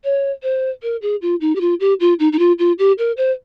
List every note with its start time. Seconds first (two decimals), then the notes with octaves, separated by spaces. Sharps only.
0.04 C#5
0.43 C5
0.83 A#4
1.02 G#4
1.22 F4
1.41 D#4
1.56 G4
1.61 F4
1.80 G4
2.00 F4
2.20 D#4
2.32 D#4
2.39 F4
2.59 F4
2.79 G4
2.98 A#4
3.17 C5